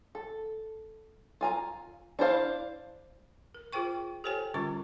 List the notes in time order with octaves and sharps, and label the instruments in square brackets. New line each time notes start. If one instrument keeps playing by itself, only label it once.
[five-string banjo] A4
F4 G#5 A#5
D4 E4 C5 F5
[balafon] A#4
F4 G#4 C5 G5 C#6
G4 A4 C5 C#5 G5 G#5
D3 G3 C#4 F4 A#5 C#6